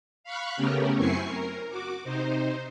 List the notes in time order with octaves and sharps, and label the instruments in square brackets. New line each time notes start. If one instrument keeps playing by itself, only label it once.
[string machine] F5 B5 C#6 F#6
C#3 A3 B3 C#4 G4 A#4
F#2 C4 E4 G#5 C#6 C7
A#4
F#4 D6
C3 D#4 C5